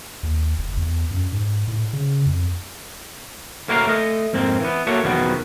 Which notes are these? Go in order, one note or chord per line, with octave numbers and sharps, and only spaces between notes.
D#2
F#1
E2
F#2
G#2
A2
C#3
F2
A2 A#3 F#4 A#4 C5 F5
A3 D#5
F2 G#2 A#3 C4
E3 B3
A#3 F#4 A4 C#5 E5
B1 E2 D#3 F3 B3 F#4